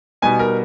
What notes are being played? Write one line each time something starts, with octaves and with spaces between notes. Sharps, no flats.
B2 G3 B3 D#4 G#5
A#4